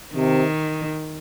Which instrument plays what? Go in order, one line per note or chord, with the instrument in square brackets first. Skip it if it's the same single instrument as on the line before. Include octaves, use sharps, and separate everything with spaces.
[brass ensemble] C3 [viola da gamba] D#3